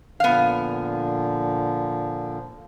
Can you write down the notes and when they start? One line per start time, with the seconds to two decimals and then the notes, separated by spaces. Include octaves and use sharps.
0.20 A#2 D3 F3 B3 F5